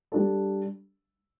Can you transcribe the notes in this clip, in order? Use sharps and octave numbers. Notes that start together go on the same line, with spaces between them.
G3 D4 A4